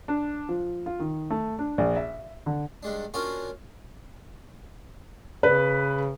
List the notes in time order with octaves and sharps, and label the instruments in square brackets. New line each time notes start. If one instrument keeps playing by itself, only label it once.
[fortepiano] D4
F3
F4
D#3
A3
D4
A#1
E5
D3
[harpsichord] G2 G#3 D4
A#3 C#4 D4 F4 F#4 A#4
[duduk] C#3 [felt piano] B4